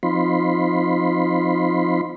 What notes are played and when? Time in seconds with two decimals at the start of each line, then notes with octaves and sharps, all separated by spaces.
0.03 F3 C4 D#4 F4 B5 C6